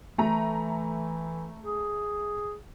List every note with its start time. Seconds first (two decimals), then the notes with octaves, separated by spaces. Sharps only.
0.18 E3 A3 A#5
1.63 G#4